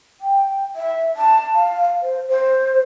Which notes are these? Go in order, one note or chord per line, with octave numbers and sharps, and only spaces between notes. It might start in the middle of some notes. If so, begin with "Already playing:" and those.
G5
E5
A5
F5
C5
C5